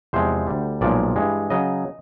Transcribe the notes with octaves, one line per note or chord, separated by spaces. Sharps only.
E2 C3 F3 G#3 C5
D2 D3 G3
B1 A#2 F3 G#3 D5
G2 E3 G#3
C#3 F#3 D#5